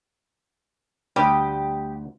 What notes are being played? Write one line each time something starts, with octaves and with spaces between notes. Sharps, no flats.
D2 G3 G4 G5 D#6